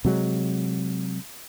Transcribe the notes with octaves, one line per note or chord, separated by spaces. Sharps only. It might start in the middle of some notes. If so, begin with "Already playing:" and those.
C3 F#3 G#3